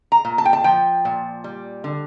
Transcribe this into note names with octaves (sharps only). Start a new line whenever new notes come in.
A#5
A#2
A5
G5
A5
F3 G5
A#2
G3
D3